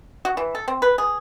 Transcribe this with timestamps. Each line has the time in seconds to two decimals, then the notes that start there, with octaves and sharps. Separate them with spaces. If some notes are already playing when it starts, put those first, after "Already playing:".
0.25 F#4
0.37 E3
0.55 A4
0.68 C4
0.82 B4
0.98 G#4